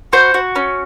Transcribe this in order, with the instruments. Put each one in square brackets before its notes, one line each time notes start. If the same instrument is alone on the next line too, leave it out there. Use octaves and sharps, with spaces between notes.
[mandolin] F#4 C5
F#4
C#4